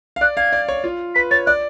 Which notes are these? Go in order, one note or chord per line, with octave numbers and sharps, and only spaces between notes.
F5
D5 F#6
F5 G#6
D5
C#5
F4
B4 B6
C#5 A6
D5 F#6